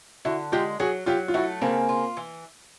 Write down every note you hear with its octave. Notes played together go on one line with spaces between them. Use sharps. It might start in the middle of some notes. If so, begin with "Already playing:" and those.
D3 E4 F#4
G#3 F4 G4
F#3 F#4 G#4
F#3 F4 G4
F4
A3 E4 F#4
C#3 A#3 C4
F4
E3